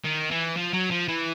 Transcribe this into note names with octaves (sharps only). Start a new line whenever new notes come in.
D#3
E3
F3
F#3
F3
E3